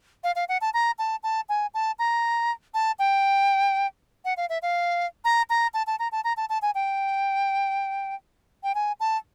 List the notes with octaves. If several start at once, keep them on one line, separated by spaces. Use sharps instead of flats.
F5
F5
F#5
A5
A#5
A5
A5
G#5
A5
A#5
A5
G5
F#5
F5
E5
F5
A#5
A#5
A5
A5
A#5
A5
A#5
A5
A5
G#5
G5
G5
G#5
A5